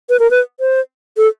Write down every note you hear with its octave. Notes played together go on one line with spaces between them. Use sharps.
B4
A#4
B4
C5
A4